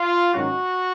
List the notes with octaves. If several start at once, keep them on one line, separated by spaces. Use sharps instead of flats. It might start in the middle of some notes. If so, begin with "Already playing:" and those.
Already playing: F4
G#2 D#3 F#3 C#4 F#4